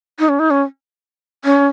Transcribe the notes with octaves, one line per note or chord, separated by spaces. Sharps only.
D#4
C#4
D#4
C#4
C#4